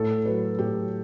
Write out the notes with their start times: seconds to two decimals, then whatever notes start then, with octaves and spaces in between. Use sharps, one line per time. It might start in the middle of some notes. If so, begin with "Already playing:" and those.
Already playing: A2 A4
0.25 F#3 B4
0.59 A2 G4